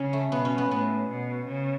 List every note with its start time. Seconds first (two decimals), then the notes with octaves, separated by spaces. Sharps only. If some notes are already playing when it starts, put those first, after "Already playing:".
Already playing: C#3 C#4
0.13 A3
0.32 B2 B3
0.45 C#4
0.58 B3
0.71 A2 B3
1.10 B2
1.47 C#3